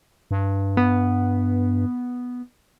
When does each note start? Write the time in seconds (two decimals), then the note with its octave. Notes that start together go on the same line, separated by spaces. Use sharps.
0.31 G2
0.77 B3